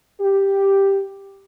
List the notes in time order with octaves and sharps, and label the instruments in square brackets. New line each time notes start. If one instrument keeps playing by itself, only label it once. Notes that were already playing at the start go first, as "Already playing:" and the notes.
[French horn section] G4